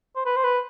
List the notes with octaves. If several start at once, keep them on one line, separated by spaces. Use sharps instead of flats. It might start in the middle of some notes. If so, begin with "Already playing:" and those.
C5
B4
C5
B4